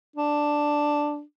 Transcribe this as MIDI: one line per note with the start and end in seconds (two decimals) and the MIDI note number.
0.16 1.22 62